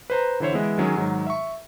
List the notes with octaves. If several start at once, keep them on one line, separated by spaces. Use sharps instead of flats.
B4 C5 A#5
D3 E3 E4 C5 C#5
E3 G#3 B3 E4
D#3 F#3 C#4 G#4
G#2 D#3 F#3
E5 C#6